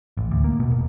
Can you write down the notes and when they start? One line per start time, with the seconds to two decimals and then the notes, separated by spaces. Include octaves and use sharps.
0.17 A1
0.31 D2
0.44 A#3
0.60 B2
0.71 E1